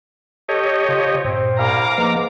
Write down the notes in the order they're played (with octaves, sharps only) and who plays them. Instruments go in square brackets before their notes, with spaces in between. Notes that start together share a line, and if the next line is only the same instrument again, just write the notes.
[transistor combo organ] G4 C#5 D#5 [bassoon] A4
[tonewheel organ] C#3 [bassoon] F3
[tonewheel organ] G2 A#2 [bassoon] C4
[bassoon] C2 [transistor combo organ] F5 [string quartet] A#5 D6
[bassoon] G#2 [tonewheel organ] F3 A#3 B4